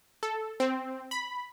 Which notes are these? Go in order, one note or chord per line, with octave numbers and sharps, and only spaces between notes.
A4
C4
B5